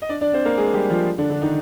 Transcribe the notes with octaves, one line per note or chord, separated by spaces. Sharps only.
D#5
D4 D5
D4 D5
C4 C5
A#3 A#4
G#3 G#4
G3 G4
F3 F4
D3 D4
D3 D4
D#3 D#4